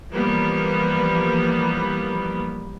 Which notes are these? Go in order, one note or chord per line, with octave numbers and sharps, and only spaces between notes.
E3 F3 G3 A#3 B3